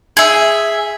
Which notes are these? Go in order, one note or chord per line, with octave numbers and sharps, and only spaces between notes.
G#4 E5